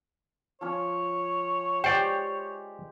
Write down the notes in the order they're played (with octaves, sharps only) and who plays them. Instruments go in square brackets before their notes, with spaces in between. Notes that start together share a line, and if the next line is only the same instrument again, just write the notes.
[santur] F3 C#4 [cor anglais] C#5
[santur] G#3 G4 [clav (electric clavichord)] C5 D5 [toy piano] G5